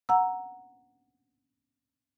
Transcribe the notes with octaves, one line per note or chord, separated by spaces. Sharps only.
F#5 A#5 E6